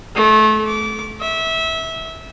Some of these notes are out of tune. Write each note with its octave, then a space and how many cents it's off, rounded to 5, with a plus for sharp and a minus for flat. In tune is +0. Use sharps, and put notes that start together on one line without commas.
A3 -30
D6 -25
E5 -20